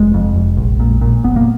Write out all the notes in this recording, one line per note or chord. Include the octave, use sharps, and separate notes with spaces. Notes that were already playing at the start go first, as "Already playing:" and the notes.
Already playing: F1 G#3
F2
F1
A#1
A#2
A#2
F1 B3
A#3